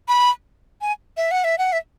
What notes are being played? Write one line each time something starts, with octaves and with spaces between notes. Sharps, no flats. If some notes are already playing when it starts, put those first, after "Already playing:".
B5
G#5
E5
F#5
E5
F#5
E5